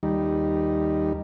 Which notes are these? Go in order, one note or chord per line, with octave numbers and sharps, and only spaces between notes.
D#2 G3 D#4